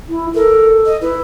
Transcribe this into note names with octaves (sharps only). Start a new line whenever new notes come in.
E4
A4 A#4
D#5
E4 B4